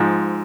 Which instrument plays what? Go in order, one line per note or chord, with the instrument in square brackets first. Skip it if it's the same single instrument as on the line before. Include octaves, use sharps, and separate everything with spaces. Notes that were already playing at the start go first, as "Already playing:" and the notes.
Already playing: [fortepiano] G#2 F3